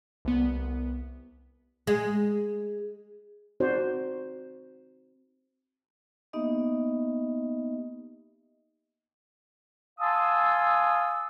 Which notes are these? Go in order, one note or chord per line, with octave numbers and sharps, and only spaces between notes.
C2 B3
G#3
C4 D#4 F#4 C5 D5
A#3 B3 D#4 G4 D#5 E5
F5 G#5 A5 C6 D#6 E6